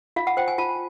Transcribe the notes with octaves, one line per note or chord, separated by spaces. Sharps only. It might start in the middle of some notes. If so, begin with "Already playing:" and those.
F4 F5
F#5
C5 G5
G#5
F4 A5